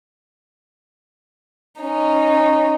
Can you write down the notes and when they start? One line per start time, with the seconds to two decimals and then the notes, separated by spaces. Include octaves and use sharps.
1.81 C#4 D#4